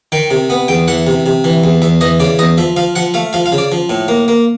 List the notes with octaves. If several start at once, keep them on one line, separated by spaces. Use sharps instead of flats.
D#3 G5
C3
B3
E2 G5
E3 F#5
C3
C3
E3
E2
E2 E5
E3 D#5
C#3 D5
E2 D#5
F3 E5
F3 F5
F3 F#5
A3 F5
F3 F5
F5
C#3
D5
F3
A2
A#3
A#3